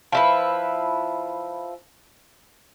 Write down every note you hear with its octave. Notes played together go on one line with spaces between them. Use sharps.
F3 E4 B4